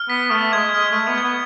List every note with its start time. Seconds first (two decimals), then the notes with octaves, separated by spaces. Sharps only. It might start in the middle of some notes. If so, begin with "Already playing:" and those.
Already playing: F6
0.09 B3 B6
0.30 A3 F6
0.53 G#3 G#6
0.74 G#3 F6
0.91 A3 F6
1.07 B3
1.18 G#6
1.24 B3